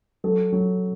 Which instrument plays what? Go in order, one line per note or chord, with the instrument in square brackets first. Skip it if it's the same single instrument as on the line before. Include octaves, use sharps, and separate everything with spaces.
[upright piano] F#3 [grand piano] A4
[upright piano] F#3